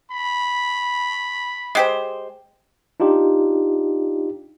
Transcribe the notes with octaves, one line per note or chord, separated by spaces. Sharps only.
B5
G#3 G4 C5
D4 D#4 F4 G4